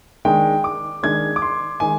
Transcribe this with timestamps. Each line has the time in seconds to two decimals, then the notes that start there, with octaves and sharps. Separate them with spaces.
0.25 D#3 G#3 D4 G5
0.64 D6
1.03 D#3 G#3 D4 G#6
1.36 D6
1.42 C6
1.80 D#3 G#3 G#5